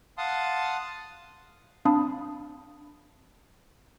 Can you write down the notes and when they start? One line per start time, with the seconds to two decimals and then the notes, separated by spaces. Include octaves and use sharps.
0.18 F5 F#5 A5 C6 D#6
1.85 C4 D4 F5 A5 B5 D#6